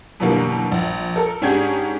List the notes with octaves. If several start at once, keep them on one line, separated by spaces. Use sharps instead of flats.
F#2 B2 D3 E3 G3 A#3
A#1
A4 A#4
G#2 C#4 D4 G4 G#4 G#6